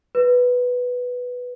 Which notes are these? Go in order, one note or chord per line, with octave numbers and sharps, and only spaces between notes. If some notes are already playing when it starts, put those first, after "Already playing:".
B4